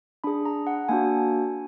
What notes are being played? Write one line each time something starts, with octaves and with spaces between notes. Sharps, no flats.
D4 G#4 B5
A#5
F#5
A#3 D4 F#4 G#5